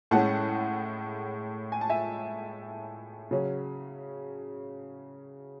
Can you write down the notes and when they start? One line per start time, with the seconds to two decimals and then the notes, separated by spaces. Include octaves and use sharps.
0.11 A2 G#3 C#4 F#5 A5
1.72 G#5
1.81 A5
1.90 E5 G#5
3.31 C#3 F#3 C#4